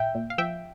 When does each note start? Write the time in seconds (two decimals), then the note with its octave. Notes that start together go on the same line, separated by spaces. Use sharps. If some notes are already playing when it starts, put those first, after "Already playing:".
Already playing: A#1 E5 G5
0.15 A#2
0.30 F5
0.38 F3 E5 G5